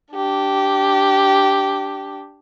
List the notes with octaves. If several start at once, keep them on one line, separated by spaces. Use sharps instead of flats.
D4 G4